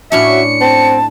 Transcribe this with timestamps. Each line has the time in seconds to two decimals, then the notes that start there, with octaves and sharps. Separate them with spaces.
0.12 A2 C#4 D4 F#4 E5 C#7
0.61 C4 A5